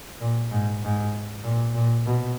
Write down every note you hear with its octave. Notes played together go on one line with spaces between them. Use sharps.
A#2
G#2
G#2
A#2
A#2
B2